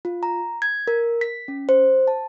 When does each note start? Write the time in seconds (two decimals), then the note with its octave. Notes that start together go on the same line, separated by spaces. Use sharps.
0.05 F4
0.23 A#5
0.62 G#6
0.87 A#4
1.21 B6
1.48 C#4
1.69 C5
2.08 A5